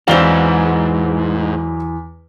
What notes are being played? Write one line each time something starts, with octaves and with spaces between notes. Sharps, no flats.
E2 G#2 E3 F#3 C4 D5 F5 G7